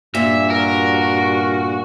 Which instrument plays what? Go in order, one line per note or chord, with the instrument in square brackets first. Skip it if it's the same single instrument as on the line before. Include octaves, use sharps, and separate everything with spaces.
[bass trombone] G2 [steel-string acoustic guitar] A#2 [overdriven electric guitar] E5
[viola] F#4 [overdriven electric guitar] A#4